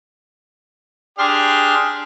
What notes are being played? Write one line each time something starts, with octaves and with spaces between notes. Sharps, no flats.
D4 G4 G#4 C6 F6